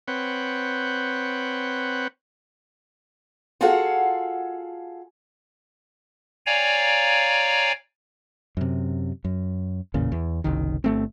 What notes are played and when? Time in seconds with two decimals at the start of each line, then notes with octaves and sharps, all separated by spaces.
0.08 C4 B4 C#5 F#5 G5
3.61 F4 F#4 G#4 A4 F5 F#5
6.46 C#5 D5 F5 G5 G#5 A#5
8.57 F#2 C3
9.24 F#2
9.94 A1 E2 A#2 C#3
10.12 E2
10.44 F#1 C2 D#3
10.84 G1 A3 C4